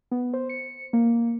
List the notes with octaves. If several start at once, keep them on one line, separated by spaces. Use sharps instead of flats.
B3
C5
C#7
A#3